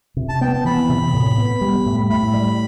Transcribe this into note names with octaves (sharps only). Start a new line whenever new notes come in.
C3
A5
B3 G5
A5
E3 B5
C3
A2
B3
G3
A2
A2 B5
G3